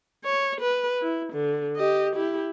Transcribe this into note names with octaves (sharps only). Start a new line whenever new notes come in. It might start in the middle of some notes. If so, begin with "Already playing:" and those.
C#5
B4
E4
D3
G4 D#5
E4 G4